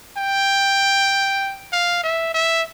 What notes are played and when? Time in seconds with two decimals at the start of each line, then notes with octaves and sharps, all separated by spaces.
0.17 G5
1.72 F5
2.03 E5
2.34 E5